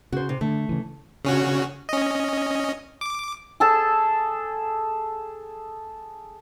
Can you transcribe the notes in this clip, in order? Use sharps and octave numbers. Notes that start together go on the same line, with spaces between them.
C#3 F#4 C5
C3
D3 A3
C#3 E3
C#3 C#4 F#4
C#4 D#5
D6
G#4 A4 A5